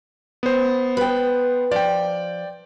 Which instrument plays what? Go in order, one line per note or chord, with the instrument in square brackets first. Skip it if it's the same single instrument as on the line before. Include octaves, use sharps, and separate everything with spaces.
[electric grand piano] B3 C5
[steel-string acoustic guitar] B4 G5
[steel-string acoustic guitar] F3 [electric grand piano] D5 G5